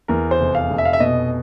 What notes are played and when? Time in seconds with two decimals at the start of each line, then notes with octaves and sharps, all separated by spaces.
0.08 E2 A#4
0.31 C5
0.39 F1
0.55 F5
0.70 F1
0.78 E5
0.85 F5
0.93 E5
1.00 B2 D#5